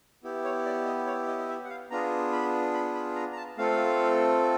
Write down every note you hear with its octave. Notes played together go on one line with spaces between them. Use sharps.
B3 E4 G4
C#5
D5
D#5
C#5
D#5
D#5
E5
F#5
F5
B3 D4 F4 G#4 A#5
B5
B5
B5
A#5
A#5
A5
A3 C4 F4 A4 F5